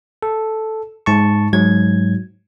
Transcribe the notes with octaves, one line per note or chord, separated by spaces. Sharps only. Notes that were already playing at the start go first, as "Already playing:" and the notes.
A4
G#2 A5 C#6
G#2 F#3 G#6